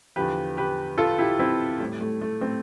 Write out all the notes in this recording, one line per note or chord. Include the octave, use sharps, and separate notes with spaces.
E2 D3 F3 G4 B4
G4 B4
F4 A4
E4 G4
C4 E4
A2 G3
A3
A3
A3 C4